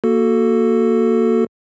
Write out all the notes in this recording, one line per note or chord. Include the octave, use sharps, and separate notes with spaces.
A#3 F#4 A4